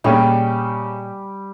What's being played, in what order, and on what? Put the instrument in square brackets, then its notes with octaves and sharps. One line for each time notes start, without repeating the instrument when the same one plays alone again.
[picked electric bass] A#2 A3 A#3 [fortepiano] C#3 D#4 [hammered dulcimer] G3 G4